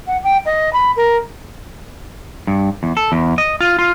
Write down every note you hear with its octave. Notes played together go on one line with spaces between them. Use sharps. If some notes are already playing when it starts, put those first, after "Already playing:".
F#5
G5
D#5
B5
A#4
G2
E2
A4
E2
D#5
F4
F4